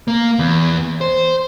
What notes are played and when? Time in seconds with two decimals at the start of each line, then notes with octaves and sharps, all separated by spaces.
0.08 A#3
0.39 E2
1.01 C5